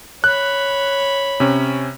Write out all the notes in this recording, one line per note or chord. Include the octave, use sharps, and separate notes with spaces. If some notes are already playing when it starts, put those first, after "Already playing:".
C#5 B5 F#6
C3 C#4